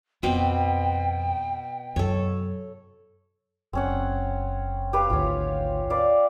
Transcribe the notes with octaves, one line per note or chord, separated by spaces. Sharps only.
F2 B2 C4 G5 D6
F#2 C3 A4 C#5
F#1 C4 C#4 F#5
G4 B4 F5
G#1 D2 F4 C#5
B4 D5 F5